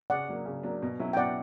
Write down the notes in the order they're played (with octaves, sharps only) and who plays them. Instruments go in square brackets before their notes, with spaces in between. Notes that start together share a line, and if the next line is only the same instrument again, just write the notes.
[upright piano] C#3 [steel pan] D5 F#5
[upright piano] F#3 A#3 D4
C#3
F#3 A#3 D4
B2
F#3 C#4 E4
[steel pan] G5
[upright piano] B2 [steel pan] D5 F#5